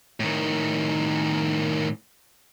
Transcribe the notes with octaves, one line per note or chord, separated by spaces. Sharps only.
A2 D#3